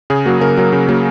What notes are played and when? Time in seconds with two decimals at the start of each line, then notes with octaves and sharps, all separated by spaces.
0.10 C#3 G#4
0.25 F#3 A#3 F#4
0.41 C#3 A#4
0.57 F#3 A#3
0.73 C#3
0.89 F#3 A#3